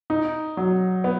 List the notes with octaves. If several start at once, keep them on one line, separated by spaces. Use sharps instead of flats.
D#4
F#3
B3